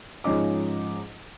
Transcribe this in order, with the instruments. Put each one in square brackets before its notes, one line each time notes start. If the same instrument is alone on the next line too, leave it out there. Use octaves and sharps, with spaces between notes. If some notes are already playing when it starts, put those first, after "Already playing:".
[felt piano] G#2 F3 C#4 D#4 D6